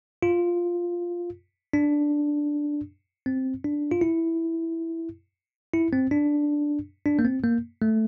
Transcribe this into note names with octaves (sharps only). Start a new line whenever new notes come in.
F4
D4
C4
D4
F4
E4
E4
C4
D4
D4
A#3
C4
A#3
A3